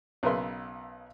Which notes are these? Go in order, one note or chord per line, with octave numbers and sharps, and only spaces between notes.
B1 C#3 A#4 B4 E5 C6